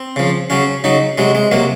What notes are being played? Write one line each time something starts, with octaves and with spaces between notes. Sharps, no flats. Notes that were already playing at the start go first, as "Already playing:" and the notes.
Already playing: C4
C#3 F3
C#3 F#3 C#4
C#3 F#3 D#4
C3 F#3 G#3
G#3
C3 F#3 A#3